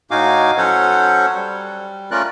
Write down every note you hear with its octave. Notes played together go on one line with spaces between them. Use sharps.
A2 D#4 F#4 F5 G#5 D6
F#3 C#4 A4 C5 C#5 F#5
G3
A3 C#4 F4 A#4 D5 F#6